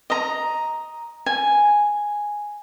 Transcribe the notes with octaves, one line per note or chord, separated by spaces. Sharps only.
D#5 A#5
G#5